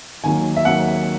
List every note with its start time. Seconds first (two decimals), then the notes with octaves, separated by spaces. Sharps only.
0.24 D#2 D#3 F#3 A#3 G#5
0.56 E5
0.65 D#2 D#3 F#3 A#3 F#5